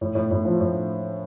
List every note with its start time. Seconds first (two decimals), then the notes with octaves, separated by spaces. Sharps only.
0.01 A2
0.15 A2
0.31 A2
0.45 F3
0.61 A2